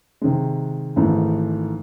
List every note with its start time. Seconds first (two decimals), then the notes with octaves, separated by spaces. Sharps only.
0.21 C3 D#3 G#3
0.96 G#1 G#2 E3 A3